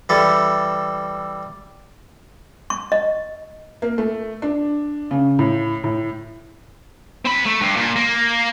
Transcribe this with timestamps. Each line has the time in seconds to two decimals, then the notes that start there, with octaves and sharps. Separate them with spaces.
0.09 E3 G3 A4
2.70 C#6
2.92 D#5
3.82 A#3
3.98 A3
4.42 D4
5.11 C#3
5.39 A2
5.84 A2
7.25 C4 B5
7.46 A3
7.61 G2
7.76 A#2
7.96 A#3